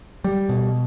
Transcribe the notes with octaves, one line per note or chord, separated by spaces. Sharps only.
G3
B2